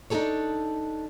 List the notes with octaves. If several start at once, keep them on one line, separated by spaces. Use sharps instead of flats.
D4 D#4 F4 G#4 A4 C#5